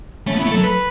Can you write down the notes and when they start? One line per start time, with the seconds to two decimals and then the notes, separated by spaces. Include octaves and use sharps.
0.27 A3 C#4
0.36 B3
0.39 E4
0.45 A3
0.51 F#3 A4
0.63 B4